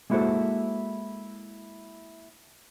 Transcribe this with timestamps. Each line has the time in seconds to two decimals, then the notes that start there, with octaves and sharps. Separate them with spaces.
0.10 G#3 A#3 E4 F#4 A4 C5